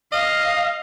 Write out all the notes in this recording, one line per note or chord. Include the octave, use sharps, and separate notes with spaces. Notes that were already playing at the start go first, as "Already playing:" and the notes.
D#5 F5